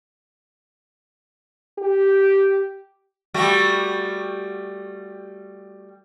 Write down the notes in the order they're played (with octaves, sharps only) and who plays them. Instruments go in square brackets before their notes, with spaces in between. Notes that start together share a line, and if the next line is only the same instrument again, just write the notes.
[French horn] G4
[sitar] G3 A3 F#4